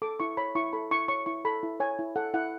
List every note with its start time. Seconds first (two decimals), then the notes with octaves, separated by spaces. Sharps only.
0.02 A4 D6
0.20 E4 C#6
0.37 C#5 B5
0.55 E4 C#6
0.73 A4 B5
0.91 E4 C#6
1.08 C#5 C#6
1.26 E4 C#6
1.45 A4 B5
1.63 E4
1.80 C#5 G#5
1.99 E4
2.16 A4 F#5
2.34 E4 F#5